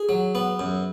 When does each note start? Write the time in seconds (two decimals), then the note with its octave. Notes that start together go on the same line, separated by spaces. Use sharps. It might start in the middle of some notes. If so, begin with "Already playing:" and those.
Already playing: G#4
0.09 F#3
0.35 B3
0.59 F#2